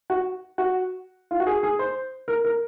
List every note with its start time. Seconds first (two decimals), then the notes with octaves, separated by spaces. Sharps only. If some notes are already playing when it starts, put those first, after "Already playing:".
0.10 F#4
0.58 F#4
1.31 F4
1.40 F#4
1.47 G#4
1.63 G#4
1.79 C5
2.28 A#4
2.45 A#4